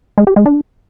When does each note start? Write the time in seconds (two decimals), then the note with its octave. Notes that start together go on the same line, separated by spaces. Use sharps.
0.18 G#3
0.27 G4
0.36 G#3
0.46 D4